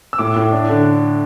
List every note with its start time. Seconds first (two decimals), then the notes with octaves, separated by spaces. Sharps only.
0.13 E6
0.18 A2 D6
0.36 A2
0.52 D4
0.69 D3